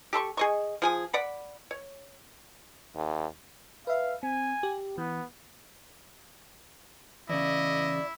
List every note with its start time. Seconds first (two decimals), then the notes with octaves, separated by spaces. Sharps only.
0.13 G4 A4 C6 C#6
0.37 G#4 D#5 C#6
0.82 F3 G#4 G#5
1.13 D5 F#5 B5
1.71 C#5
2.96 D#2
3.87 B4 E5 F5
4.23 C4 G#5
4.63 G4
4.98 E3 B3
7.29 E2 C#3 E4 D5 D#5